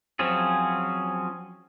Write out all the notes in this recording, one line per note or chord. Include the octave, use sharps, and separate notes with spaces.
F3 F#3 C4 C#4 G#4